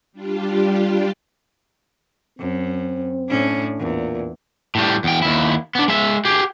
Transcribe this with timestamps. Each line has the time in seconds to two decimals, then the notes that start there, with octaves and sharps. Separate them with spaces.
0.12 G3 D4 F4 G4
2.39 F#2 C4
3.28 A2 C#4 D4
3.80 E2 A#2
4.75 A2 G3
5.04 E2 G5
5.22 D#2 E4
5.75 B3 D4
5.88 G#3 E5
6.25 G4 G#4